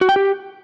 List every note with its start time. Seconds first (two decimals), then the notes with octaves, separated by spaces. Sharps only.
0.01 F#4
0.09 G5
0.16 G4